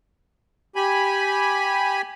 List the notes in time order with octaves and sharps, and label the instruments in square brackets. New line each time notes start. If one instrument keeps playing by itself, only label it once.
[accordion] G4 G#5 B5